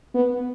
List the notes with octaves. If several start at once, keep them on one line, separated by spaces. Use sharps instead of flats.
B3